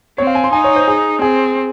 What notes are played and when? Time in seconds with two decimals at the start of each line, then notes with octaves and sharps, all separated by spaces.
0.18 C4 C#5
0.27 F5
0.35 G#5
0.44 C6
0.53 D#4 G#5
0.64 C#5
0.76 C5
0.88 G#4
1.22 C4 G#4